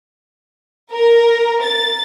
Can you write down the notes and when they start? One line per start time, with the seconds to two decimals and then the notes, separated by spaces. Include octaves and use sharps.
0.92 A#4
1.63 A6